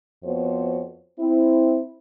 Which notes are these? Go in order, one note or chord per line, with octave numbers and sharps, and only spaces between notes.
F2 B3 F#4 C5 C#5
C4 E4